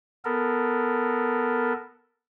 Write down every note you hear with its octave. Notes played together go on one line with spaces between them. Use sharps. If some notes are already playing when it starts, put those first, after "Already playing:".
B3 A4 A#4